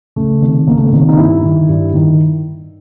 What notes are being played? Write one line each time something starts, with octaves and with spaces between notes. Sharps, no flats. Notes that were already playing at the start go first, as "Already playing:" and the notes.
C#2 A3
C3 D#3
C#2 A#3
A3
A#3
C3 D#3
D#4
G2 E4
D#3
G2
D#3